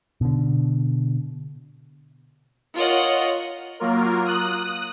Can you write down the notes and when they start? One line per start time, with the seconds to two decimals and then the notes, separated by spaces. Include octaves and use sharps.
0.21 B2 D3
2.75 F4 A#4 C#5 D#5 F#5
3.80 F#3 A#3 F4 A#4
4.25 D#6 F#6